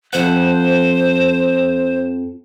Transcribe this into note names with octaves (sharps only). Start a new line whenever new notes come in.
F2 C5 F#5